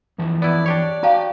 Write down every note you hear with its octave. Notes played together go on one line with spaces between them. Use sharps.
F2 E3 A5
B3 E4 D5
D4 G4 C#5
F#4 F5 G5 A5 A#5